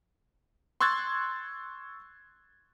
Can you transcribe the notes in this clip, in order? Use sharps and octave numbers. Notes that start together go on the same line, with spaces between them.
C6 C#6 E6 F#6 G#6 A6